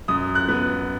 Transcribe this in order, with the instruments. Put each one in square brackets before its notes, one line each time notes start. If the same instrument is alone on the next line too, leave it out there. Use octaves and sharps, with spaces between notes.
[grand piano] F#2 [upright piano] D#6
[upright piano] F#6
[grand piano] B3